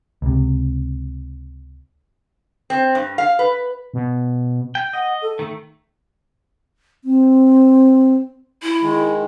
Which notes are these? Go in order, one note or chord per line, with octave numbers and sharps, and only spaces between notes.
C#2 C3
C4
G2
F5
B4
B2
G5
D#5 F#5
A4
D#3 A3
C4
E4
D#3 G#3